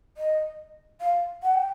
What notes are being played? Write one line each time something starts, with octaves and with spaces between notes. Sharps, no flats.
D#5
F5
F#5
G5